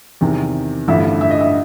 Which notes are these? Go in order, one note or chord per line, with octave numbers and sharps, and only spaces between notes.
E2 C3 D#3
A1 G2 D3 F3 E5
E5
D#5
E5